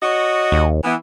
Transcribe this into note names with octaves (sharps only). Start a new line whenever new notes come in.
F#4 C#5 D#5
D#2
E3 B3